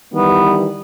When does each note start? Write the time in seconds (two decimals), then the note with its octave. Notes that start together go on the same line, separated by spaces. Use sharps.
0.14 D#3 E3 G3 B3